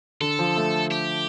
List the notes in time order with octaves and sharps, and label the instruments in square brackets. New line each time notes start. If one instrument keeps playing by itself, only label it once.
[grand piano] D3 [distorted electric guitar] A4
[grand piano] F3
A3
[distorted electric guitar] G4